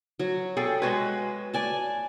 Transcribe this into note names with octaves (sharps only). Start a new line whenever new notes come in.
F#3
G#4 A4 G5
G#3 F#4 B4
D5 G#5 A5